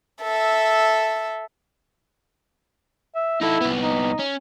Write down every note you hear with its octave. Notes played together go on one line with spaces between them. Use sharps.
A4 E5
E5
D#4 E4 A4
C2 B3
D#4
C#4